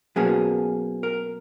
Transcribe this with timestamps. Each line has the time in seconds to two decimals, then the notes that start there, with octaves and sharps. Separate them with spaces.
0.16 B2 F#3 A#3 C#4 G#4
1.03 A#4